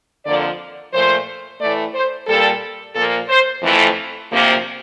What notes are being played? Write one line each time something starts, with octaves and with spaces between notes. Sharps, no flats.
F2 D3 F3 A#3 D5
A#2 F3 A3 C5
A2 E3 A3 D5
C5
A#2 G3 A#3 A4
A#2 F3 A#3 A4
C5
F2 E3 A3
D2 C3 F3 A#3